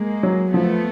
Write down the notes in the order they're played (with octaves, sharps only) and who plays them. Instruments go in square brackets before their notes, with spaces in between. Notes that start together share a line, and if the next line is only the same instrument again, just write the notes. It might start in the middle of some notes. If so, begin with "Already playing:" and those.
Already playing: [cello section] G#3 A#3
[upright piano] F#3
[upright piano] F3 [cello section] A3 B3